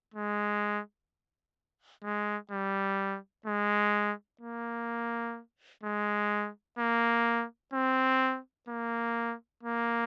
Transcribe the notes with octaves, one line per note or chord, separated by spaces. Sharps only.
G#3
G#3
G3
G#3
A#3
G#3
A#3
C4
A#3
A#3